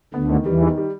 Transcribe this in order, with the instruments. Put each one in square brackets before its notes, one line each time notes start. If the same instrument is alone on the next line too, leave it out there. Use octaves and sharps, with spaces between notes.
[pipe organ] D2 D3 [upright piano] B3
[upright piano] D#3
[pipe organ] E2 E3 [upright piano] G3
[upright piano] D#3
G3